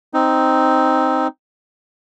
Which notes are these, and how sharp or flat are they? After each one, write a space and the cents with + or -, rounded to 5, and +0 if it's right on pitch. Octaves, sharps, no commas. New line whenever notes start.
C4 +0 D#4 +0